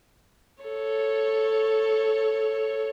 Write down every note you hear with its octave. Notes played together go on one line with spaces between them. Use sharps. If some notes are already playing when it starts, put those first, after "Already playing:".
A4 C#5